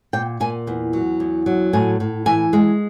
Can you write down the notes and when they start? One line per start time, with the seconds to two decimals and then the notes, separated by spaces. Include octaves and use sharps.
0.13 A#2 G5
0.40 A#2 G#5
0.67 E2
0.93 F#3
1.20 E2
1.46 F#3
1.73 A2 G#5
2.00 A2
2.26 E3 G#5
2.53 G#3